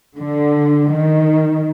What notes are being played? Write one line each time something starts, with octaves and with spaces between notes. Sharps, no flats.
D3
D#3